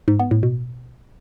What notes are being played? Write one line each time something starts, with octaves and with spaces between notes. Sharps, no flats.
G#2
B3
A2
B2